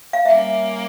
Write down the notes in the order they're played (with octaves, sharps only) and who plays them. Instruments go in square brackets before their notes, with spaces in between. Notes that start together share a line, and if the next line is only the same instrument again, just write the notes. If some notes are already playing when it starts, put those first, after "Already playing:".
[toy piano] F5
[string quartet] G3 A#3 C#4 [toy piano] E5